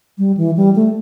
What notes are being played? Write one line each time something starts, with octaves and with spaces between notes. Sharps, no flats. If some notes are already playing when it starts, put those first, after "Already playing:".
G3
E3
G3
A3